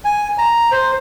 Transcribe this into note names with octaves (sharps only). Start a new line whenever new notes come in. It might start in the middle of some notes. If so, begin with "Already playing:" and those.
G#5
A#5
C5